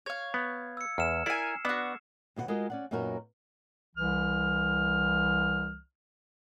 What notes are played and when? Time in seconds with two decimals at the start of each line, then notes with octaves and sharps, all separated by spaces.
0.06 C#5 F5 G#6
0.34 B3
0.77 E6 C#7
0.98 E2 F6 E7
1.26 E4 A#4 D5 G#5 C7
1.65 B3 D4 F#4
2.36 D#2 B2 G4 F#5
2.48 G#3 F4 F#4 A#4 D#5
2.70 C#4 D5 F#5
2.91 F#2 A#2 B3 D#4 F#4 A#4
3.96 C2 E3 F6